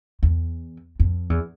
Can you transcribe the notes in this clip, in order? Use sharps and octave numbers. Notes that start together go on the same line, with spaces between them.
E2
F2
E2